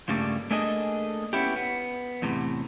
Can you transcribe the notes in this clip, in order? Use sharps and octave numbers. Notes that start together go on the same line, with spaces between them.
C#2 G2 C#3 G3 A3 A#3
A3 A#3 D4 G#4 A4 D#5
B3 C#4 E4 G4
B3
E2 A2 C3